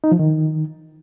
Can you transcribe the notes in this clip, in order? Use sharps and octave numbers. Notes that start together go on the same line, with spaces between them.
D#4
F3
D#3